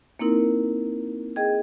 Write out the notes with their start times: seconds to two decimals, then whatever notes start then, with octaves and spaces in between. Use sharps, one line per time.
0.19 A#3 C4 D#4 E4 A#4
1.36 G#4 D#5 G5 G#6